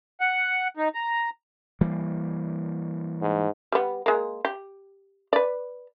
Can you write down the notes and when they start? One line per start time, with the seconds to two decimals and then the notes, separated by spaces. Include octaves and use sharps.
0.21 F#5
0.77 D#4
0.95 A#5
1.81 E3 G3 A#3
3.21 G#2
3.72 G3 B3
4.06 G#3 A#3
4.45 G4
5.33 B4 D5